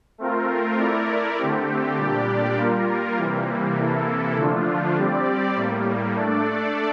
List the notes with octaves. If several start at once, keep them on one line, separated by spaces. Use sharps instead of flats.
A3 C4 F4 A#4
A3 E4 A#4 D5
D3 A3 C4 G4
A#2 G3 D4 G4 D5
G3 A#3 F4 A#4
C3 E3 G3 A#3
C3 E3 A#3 E4 A4
D3 F3 A3 D4 F4
G3 C4 G4 D5
A2 G3 A#3
A3 D4 A4 D5